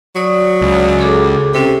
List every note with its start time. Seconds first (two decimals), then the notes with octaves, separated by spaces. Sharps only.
0.16 F#3 D5 C#6 D#6
0.61 C#2
0.99 G#4 A4 D6
1.54 C3 C#4 A4 G5